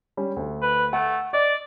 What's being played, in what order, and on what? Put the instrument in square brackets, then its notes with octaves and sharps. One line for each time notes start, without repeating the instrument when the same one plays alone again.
[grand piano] G3 C#4
D2
[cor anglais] B4
[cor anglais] A3 [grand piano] F#5
[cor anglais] D5 [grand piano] D#5